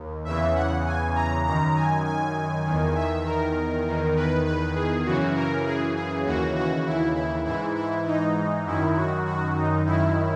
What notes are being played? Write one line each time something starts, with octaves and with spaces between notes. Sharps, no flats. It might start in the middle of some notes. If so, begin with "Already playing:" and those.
Already playing: D#2
E2 C#3 E3 E5
F#5
G#5
A#5
F#2 D#3 A#5
G#5
G#5
E2 D#3
E5
A#4
E2 D#3
B4
B4
G#4
F#2 C#3 E3 F#4
A#4
G#4
G#4
D#2 C#3 E3 F#4
F#4
E4
E4
G#2 E3 E4
E4
D#4
F#2 D#3 E4
F#4
F#4
D#4
F#2 D#3 E4